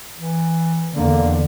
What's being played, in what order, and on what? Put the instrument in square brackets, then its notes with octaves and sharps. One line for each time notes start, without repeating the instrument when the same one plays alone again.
[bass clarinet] E3
[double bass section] E2 D3 [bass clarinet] A#3